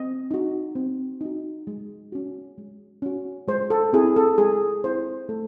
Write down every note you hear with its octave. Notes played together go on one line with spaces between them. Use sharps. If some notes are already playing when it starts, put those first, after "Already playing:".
Already playing: C4 D#5
D#4 F#4
C4
D#4 F#4
G#3
C#4 F#4
G#3
C#4 F#4
G#3 C5
A4
C4 E4 G#4
A4
G#3 G#4
C4 E4 C5
A3 A4